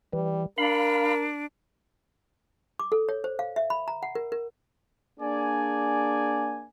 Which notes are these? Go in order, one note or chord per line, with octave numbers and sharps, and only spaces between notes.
E3 G3
D4 A#4 F5 B5
D6
A4
C#5
C5
F5
E5
B5
A#5
F#5
A#4
A#4
A#3 D4 G#4 D5 G#5